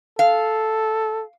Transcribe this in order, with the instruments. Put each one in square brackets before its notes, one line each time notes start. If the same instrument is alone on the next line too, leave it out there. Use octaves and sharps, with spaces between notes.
[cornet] A4 [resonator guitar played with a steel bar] F5